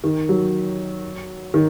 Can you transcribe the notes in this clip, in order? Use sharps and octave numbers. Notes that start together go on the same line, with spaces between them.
D#3
F#3
D#3